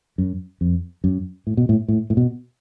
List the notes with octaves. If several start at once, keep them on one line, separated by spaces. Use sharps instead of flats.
F#2
F2
F#2
A2
B2
A2
A2
A2
B2